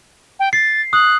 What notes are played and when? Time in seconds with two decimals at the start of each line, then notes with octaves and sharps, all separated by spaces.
0.40 G5
0.53 A6 C7
0.93 D#6 F#6